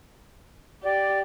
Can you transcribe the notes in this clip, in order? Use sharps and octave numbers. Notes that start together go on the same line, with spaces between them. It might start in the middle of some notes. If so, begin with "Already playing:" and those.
G4 D5